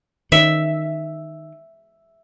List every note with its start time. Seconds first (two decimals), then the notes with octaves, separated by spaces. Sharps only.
0.32 D#3 E5